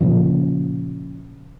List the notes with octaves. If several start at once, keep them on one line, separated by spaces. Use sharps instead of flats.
A#2 C#3 F3